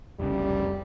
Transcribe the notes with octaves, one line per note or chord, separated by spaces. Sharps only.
F1 C2 C#3 G3